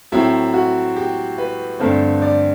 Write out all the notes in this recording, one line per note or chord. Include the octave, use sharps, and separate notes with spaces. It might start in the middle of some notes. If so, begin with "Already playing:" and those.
A2 F#3 C4 E4
F#4
G4
B4
G2 D3 A3 C4 C5
D5